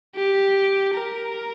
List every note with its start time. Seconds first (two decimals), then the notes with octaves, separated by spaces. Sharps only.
0.16 G4
0.95 A#4